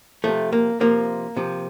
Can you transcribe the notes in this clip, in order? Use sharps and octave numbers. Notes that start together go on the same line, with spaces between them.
C3 F3 A3
A#3
C3 F3 A#3
C3 F3